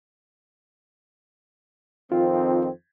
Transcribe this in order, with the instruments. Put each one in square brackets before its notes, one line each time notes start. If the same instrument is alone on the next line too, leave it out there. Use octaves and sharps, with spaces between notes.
[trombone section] F2 D#3 C4 [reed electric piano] F4